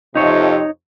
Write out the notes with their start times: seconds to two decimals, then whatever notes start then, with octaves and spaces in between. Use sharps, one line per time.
0.15 F2 C3 D#4 C#5